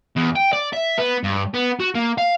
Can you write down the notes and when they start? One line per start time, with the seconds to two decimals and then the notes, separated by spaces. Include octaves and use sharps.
0.16 E2
0.36 G5
0.53 D5
0.73 E5
0.98 B3
1.24 G2
1.54 B3
1.80 F#4
1.95 A#3
2.18 F5